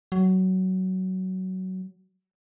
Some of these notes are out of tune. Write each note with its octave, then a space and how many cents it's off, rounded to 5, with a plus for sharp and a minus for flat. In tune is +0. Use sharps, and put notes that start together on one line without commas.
F#3 +15